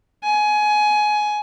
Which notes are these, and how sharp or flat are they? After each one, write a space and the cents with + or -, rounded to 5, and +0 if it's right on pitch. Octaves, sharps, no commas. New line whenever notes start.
G#5 +20